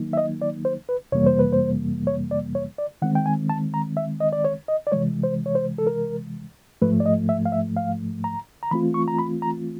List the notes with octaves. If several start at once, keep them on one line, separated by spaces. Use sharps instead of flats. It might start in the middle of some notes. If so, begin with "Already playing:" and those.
Already playing: D#3 F#3 A#3 D#4
E5
D#5
D5
C5
B4
F2 C3 E3 G3 A#3 C#5
C5
B4
C5
C#5
D5
C#5
D5
D#3 G#3 C4 F#5
G5
G#5
A5
A#5
E5
D#5
D5
C#5
D#5
D5
C3 E3 G#3 C#5
C5
C#5
C5
A4
A#4
G#2 F3 A3 B4
D5
D#5
E5
F5
E5
F5
A#5
A#5
E3 A3 C4 F4 B5
C#6
A#5
B5
A#5